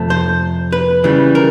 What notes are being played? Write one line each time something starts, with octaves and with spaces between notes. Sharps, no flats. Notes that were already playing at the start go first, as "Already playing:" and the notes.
Already playing: F2 C3 F3 A3
C5
B4
C#3 E3 G3
A#4